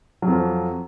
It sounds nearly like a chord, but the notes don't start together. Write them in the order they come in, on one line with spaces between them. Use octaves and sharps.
F#3 F2 F3